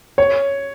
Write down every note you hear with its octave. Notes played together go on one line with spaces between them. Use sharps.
C#5